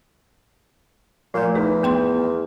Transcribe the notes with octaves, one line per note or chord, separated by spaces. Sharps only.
A#2 F3 A3
E2 D#4
B3 G5 C6